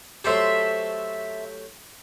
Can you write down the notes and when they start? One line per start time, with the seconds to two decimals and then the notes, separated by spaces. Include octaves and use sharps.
0.24 F#3 A3 G4 A4 C5 E5